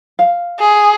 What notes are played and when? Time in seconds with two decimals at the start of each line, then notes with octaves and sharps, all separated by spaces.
0.19 F5
0.59 G#4